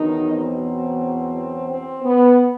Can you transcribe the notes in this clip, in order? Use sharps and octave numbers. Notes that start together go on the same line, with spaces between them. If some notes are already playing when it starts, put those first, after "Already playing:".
Already playing: E2 B2 D#3 F#3 D#4
C4
C4
B3